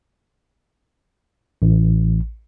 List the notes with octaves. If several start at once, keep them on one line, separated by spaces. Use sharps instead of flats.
A1